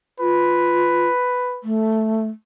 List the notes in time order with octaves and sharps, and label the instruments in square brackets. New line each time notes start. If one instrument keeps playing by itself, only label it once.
[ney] F4 [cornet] B4
[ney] A3